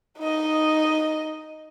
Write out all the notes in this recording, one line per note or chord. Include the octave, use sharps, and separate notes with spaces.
D#4 D#5